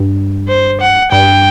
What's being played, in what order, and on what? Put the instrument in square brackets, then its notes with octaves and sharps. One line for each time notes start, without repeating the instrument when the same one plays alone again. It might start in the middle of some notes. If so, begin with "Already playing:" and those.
Already playing: [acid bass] G2
[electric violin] C5
F#5
[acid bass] G2 [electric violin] G5